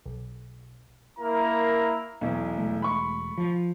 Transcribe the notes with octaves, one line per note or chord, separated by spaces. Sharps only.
B1
A#3 E4 A#4 A#5
B1 E2
E1 A3
B5 C#6
F3